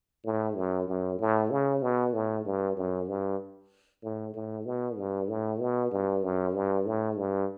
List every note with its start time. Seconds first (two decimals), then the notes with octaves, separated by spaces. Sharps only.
0.25 A2
0.56 F#2
0.87 F#2
1.19 A2
1.51 C#3
1.82 B2
2.14 A2
2.45 G2
2.77 F#2
3.08 G2
4.03 A2
4.34 A2
4.65 B2
4.97 G2
5.29 A2
5.60 B2
5.91 G2
6.23 F#2
6.54 G2
6.86 A2
7.17 G2